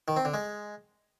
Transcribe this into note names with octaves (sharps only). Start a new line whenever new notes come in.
D#3
C4
D3
G#3